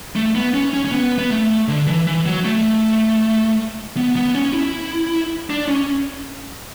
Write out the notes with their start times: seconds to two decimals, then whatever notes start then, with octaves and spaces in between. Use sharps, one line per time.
0.16 A3
0.35 B3
0.54 C#4
0.74 C#4
0.85 C#4
0.92 B3
1.18 B3
1.31 A3
1.68 D3
1.87 E3
2.07 E3
2.26 F#3
2.45 A3
3.97 B3
4.16 B3
4.35 C#4
4.54 E4
5.50 D4
5.68 C#4